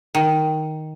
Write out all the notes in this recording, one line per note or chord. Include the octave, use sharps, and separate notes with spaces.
D#3